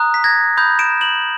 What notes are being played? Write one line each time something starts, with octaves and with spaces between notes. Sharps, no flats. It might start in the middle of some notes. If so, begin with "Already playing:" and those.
Already playing: A#5 D#6 F#6
B6
G#6 A#6
B5 D#6 G6
D7 E7
E7 F#7